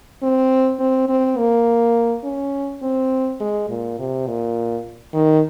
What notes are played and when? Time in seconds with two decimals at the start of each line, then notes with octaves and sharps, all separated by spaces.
0.22 C4
0.79 C4
1.09 C4
1.37 A#3
2.24 C#4
2.82 C4
3.40 G#3
3.69 A#2
3.99 C3
4.27 A#2
5.14 D#3